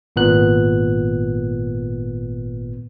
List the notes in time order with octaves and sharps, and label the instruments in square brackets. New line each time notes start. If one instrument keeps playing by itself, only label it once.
[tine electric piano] G#1 A#2 B3 F#6